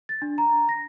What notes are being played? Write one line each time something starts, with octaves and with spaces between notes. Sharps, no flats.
A6
D4
A#5
A#6